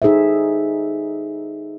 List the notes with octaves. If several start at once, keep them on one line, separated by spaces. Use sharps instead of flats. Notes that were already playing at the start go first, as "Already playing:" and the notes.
D#4 G#4 A4 C5 E5